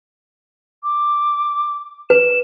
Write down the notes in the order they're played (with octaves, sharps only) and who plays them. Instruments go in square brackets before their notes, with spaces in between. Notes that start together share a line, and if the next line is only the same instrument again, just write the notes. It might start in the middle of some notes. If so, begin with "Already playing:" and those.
[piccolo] D6
[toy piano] B4 [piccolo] E7